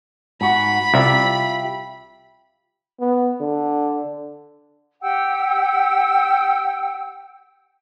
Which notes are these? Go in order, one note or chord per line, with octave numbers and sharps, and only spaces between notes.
G#2 F#4 F#5 B5
C2 F4 G4 E5
B3
D3
G4 F#5 G5 E6